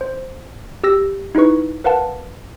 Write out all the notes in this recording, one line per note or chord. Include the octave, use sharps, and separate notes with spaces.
C5
G4 E6 A#6
D#4 E4 G#4 B4 C#6
A#4 B4 F5 F#5 A5